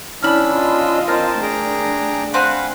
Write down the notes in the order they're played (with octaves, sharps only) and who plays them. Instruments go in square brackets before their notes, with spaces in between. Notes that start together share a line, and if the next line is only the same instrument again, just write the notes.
[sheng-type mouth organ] C#4 D4 E6 [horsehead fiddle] E4 [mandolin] B5 F6
[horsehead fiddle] F4 D#5
[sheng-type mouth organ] C4 C5 A5 [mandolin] A#4
[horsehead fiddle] A3 D4 [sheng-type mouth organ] G#4 G5 A#5
[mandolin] C4 G#5 F#6 [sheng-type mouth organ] F5 F#5 B5